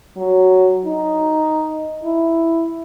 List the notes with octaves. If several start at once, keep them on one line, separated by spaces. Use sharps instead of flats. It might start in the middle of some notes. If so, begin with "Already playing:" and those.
F#3
D#4
E4